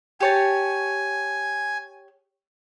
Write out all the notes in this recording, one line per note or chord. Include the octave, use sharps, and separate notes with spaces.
G4 C#5 G#5 A5